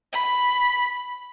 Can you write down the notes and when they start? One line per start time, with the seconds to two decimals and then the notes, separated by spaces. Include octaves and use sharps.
0.13 B5